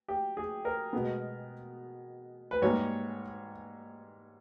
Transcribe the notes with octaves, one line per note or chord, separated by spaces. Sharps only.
G4
G#4
A#4
B2 G#3 B3
B4
G#2 G3 A#3 C#5